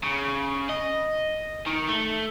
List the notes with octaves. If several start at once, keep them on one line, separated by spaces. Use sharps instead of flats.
C#3
D#5
D#3
A3